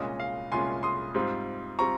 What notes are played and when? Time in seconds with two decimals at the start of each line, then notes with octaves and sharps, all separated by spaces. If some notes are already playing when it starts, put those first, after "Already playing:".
Already playing: C2 A#2 G#3 C#4 F4 D#5
0.20 F5
0.52 C2 A#2 G#3 C#4 F4 G#5 C6
0.83 C6 D#6
1.15 G#2 G3 C4 F4
1.79 G3 C4 F4 A#5 C#6